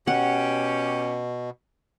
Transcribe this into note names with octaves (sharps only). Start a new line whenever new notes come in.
B2 C#4 G4 F#5